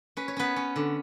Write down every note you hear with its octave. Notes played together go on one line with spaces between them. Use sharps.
C#4 B4
C#5
B3 C#4 B4
C#4
D3